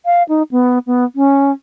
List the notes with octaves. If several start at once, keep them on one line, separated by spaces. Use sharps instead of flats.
F5
D#4
B3
B3
C#4